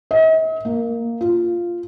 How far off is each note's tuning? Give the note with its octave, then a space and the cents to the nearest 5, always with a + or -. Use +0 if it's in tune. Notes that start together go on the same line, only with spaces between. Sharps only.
D#5 +45
A#3 -5
F4 -5